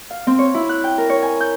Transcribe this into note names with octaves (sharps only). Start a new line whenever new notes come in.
F5
C4
C#5
E4
F#6
G5
A#4
C#5
G#5
G6